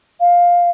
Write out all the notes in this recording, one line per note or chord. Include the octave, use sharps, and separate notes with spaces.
F5